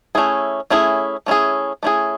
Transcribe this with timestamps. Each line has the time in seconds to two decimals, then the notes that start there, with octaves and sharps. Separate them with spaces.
0.15 A3 C#4 E4 G#4
0.70 A3 C#4 E4 G#4
1.26 A3 C#4 E4 G#4
1.83 A3 C#4 E4 G#4